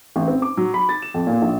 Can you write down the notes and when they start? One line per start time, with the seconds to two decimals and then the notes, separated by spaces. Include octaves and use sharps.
0.16 A1
0.28 C4
0.42 D6
0.57 F#3
0.74 B5
0.89 A6
1.02 E7
1.14 F2
1.27 A#2
1.42 A#1